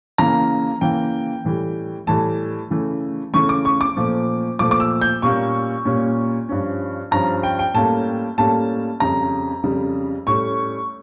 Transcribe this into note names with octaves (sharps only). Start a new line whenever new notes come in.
C#3 E3 A#3 A#5
C#3 E3 A#3 G5
A2 E3 G3
A2 E3 G3 A5
C#3 E3 A3
C#3 E3 A3 C#6
D6
C#6
D6
A#2 F3 A3
A#2 F3 A3 D6
D6
E6
G6
A#2 G3 A#3 C#4 C#6
A#2 G3 A#3 C#4
G2 F3 C#4
G2 F3 C#4 A#5
G5
G5
A2 G3 A#3 C#4 A5
A2 G3 A#3 C#4 A5
F2 C#3 G3 A#5
F2 C#3 G3
A2 G3 C#4 C#6